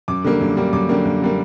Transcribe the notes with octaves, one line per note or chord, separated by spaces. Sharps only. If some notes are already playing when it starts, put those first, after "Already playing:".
F#2 D6
D3 G3 A#3
F#2
D3 G3 A#3
F#2 D6
D3 G3 A#3
F#2
D3 G3 A#3